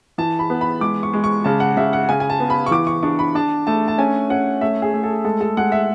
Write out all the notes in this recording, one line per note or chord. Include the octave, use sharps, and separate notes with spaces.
E3 A5
B5
B3
B5
G#3 D6
C#6
G#3
C#6
C#3 A5
F#5
C#3 E5
F#5
C#3 G#5
G#5
A5
B3
B5
C#6
E3 D6
C#6
D4 C#6
B5
D4 A5
A3 A5
A5
C#4 G#5
C#4 F#5
A3 E5
G#4
A3
A4
G#3 A4
A4
G#3 F#5
E5